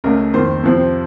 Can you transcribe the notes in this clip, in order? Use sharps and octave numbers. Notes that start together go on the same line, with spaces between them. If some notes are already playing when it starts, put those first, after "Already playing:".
C#2 C#3 A3 C#4 A#4
F2 D#3 A#3 C5
F2 C3 F3 C4